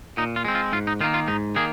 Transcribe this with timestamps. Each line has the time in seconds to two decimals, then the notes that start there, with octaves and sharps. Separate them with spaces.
0.17 A#2 D#4
0.36 F4
0.45 G#3 C4
0.55 F4
0.72 G#2 F4
0.87 D#4
1.01 D#3 F4
1.04 A#3
1.14 F4
1.28 G#2 D#4
1.56 D#3 A#3 G#4